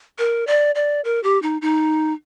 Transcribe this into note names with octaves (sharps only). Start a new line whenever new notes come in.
A#4
D5
D5
A#4
G4
D#4
D#4